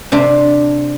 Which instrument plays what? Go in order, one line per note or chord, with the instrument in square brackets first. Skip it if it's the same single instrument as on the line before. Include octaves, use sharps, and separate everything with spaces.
[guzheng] C3 D4 C5